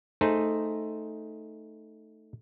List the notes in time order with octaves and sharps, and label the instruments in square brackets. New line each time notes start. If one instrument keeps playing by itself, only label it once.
[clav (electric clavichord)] A3 D#4 G#4 C5